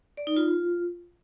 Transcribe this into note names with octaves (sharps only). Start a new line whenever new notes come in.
D5
D#4
F4